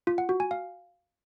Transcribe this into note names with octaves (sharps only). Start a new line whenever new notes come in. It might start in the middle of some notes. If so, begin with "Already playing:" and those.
F4
F#5
F#4
G#5
F5